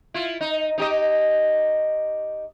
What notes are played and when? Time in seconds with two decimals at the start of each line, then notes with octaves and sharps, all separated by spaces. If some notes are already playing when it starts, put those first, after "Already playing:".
0.14 E4 F4
0.41 D#4
0.78 D#4 G4 D#5